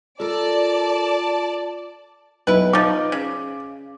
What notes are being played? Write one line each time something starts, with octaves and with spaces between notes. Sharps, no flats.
F4 A4 A#4 D5 A5
B1 E4 B4
F3 D#4 D6
C#3